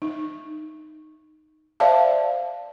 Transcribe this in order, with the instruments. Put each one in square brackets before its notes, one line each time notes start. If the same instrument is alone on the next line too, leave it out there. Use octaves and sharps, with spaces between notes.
[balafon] D#4
C5 D5 E5 F5 A5